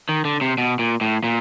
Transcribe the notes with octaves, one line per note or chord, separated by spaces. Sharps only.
D#3
D3
C3
B2
A#2
A2
A#2